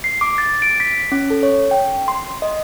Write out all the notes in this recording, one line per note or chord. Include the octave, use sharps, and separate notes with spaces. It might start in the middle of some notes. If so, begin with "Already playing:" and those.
C7
D6
A6
D7
B6
C#4
A4
C#5
G5
C6
D#5